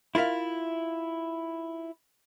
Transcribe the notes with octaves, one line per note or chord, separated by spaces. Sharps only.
E4 F4 A#4 E5 F5